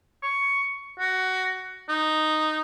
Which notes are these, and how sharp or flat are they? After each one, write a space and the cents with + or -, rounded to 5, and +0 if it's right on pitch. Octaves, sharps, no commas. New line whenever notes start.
C#6 +10
F#4 +15
D#4 -5